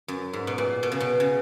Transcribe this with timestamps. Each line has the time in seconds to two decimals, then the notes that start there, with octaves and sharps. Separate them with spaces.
0.08 F#2
0.33 G#2
0.47 B2
0.58 A#2
0.83 B2
0.92 C#3
1.00 B2
1.20 C#3